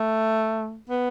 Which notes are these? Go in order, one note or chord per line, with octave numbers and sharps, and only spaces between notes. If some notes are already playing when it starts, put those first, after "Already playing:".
Already playing: A3
B3